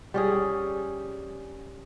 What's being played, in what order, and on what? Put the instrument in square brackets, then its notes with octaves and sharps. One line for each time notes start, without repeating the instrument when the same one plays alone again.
[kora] G3 C#4 G#4